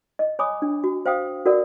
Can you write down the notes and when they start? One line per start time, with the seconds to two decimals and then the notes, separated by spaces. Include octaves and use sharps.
0.19 D#5
0.39 C#5 G#5 B5 D6 D#6
0.62 D4
0.84 F#4
1.06 C5 F5 G5 D#6
1.46 F#4 A4 A#4 D5 F#5